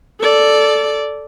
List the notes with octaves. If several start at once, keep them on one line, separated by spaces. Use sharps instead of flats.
A4 D5